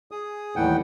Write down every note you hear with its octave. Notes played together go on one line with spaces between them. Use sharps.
G#4 D#6
D#2 A2 E3 G3 F#5 G5